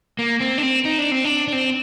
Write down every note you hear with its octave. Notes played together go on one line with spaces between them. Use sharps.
A#3
C4
D4
C4
D#4
D4
C4
D4
D4
C4